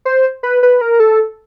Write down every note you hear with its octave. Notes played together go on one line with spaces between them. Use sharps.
C5
B4
B4
A#4
A4